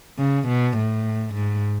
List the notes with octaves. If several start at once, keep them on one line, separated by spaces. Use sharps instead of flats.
C#3
B2
A2
G#2